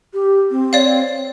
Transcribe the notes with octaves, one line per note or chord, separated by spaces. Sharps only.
G4
C4
C#5 D5 F5